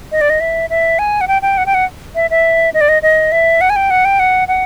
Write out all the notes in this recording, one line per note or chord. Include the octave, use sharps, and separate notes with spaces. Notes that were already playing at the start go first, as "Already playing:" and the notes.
D#5
D5
D#5
E5
E5
G#5
F#5
G5
G5
F#5
G5
F#5
E5
E5
D#5
D5
D#5
D#5
E5
F#5
G#5
G5
F#5
G5
F#5
F#5